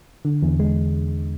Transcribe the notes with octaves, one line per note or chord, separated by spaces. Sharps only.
D3
E2
G#3